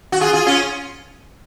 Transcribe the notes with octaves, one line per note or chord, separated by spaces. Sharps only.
F#4
F4 G#4
F4 G#4
C#4 F4